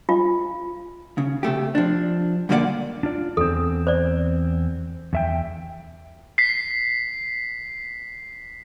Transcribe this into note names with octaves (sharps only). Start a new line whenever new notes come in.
F4
C#3
C3 A3 G4
F3 D4
G2 D3 A#3 D#4 D5 F#5
D4 F4 D5
E2 C4 A4
C5 D5
E2 E5 G5
B6 C7